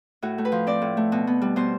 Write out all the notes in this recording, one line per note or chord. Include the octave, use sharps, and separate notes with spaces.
A2 F#4
A3
B4
F3
C4 D5
A2
A3
B2
B3
G3
B2 C5